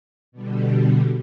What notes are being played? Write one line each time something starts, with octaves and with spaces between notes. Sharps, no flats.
B2 D3 G3